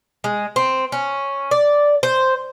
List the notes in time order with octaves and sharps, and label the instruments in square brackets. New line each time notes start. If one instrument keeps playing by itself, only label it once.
[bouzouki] G#3
C4
C#4
D5
C5